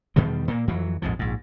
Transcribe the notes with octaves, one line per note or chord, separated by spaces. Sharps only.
E2 B2 D#3 G3
A#2 A#3
F2 E3 F#3
A#1 F2 G#2 F3
A#1 G#2